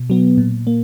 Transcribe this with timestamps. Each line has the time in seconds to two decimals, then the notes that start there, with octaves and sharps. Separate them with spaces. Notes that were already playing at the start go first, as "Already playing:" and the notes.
Already playing: B2
0.10 F#3 B3
0.38 A#2
0.67 A#3